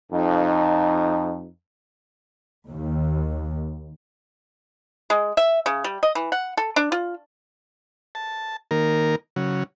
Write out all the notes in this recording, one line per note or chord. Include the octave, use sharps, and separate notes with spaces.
F2 D#4
D#2
G#3
E5
C#3
G3
D#5
E3
F#5
A4
D4
F4
A5
D#3 A#3 A#4
C#3 F#3